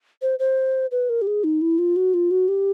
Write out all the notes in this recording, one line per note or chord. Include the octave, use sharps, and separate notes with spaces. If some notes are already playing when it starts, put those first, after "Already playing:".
C5
C5
B4
A#4
G4
G#4
D#4
E4
F4
F#4
F4
F#4
G4